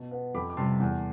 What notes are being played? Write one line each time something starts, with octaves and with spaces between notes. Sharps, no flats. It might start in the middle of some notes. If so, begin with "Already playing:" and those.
Already playing: B2 A5
B3
F2 B5 D6
D6
C3 G3 A5 C6
E2